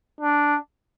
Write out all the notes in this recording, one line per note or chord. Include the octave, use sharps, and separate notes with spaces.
D4